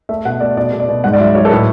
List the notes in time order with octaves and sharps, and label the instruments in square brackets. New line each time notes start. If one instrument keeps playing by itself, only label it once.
[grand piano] A3 E5
B2 F#5
A3 D5
B2 D5
B2
D5
B2
G#2 F#5
D5
F#3 E5
F#3 C#5
A4
A2 B4